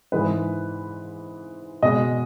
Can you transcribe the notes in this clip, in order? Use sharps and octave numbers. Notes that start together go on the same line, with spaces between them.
G#2 E3 G#3 B4
B2 G#3 D#5